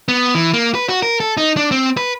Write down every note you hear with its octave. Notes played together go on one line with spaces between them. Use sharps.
B3
E3
A#3
B4
F#4
A#4
A4
D#4
D4
C4
B4